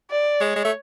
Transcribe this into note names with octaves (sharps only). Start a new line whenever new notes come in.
D5
G#3 C#5
G#3
A3